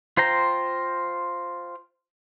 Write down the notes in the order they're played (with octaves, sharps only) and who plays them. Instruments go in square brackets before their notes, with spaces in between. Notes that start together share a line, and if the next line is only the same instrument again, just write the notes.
[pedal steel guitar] F4 C5 G5 A#5